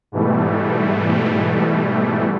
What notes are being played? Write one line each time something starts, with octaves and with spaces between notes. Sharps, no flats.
G#2 B2 E3 G3 A3